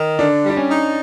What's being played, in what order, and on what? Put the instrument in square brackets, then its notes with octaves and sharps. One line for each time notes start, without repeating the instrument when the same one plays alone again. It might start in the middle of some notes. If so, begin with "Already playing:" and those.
Already playing: [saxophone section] D#3
[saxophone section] D3 [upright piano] D4
[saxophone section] G3
[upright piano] D4
C#4
[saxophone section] D#4